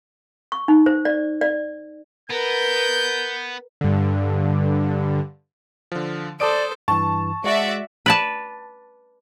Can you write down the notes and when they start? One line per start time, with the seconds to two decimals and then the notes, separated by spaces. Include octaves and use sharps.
0.52 C#6
0.68 D#4
0.86 C5
1.05 D5
1.41 D5
2.30 B3 A#4 B4 G6
3.81 G2 D3
5.92 D3 F3
6.40 A4 C5 D5 A5 D#6 D7
6.88 G2 E3 A5 C#6
7.44 G#3 F#4 D5 E5
8.06 B4 D5 A5